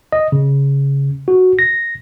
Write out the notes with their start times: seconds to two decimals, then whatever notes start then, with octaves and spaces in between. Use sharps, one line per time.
0.12 D#5
0.32 C#3
1.28 F#4
1.59 A#6